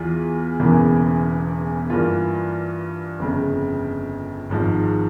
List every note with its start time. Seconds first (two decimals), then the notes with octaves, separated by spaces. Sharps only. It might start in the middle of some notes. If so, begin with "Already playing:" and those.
Already playing: E2 E3 F4 G#4
0.60 E1 E2 C#3 E3 A#3
1.90 G2 E3 A#3 F4
3.19 G1 F2 C#3
4.50 G#1 G#2 F3 G#3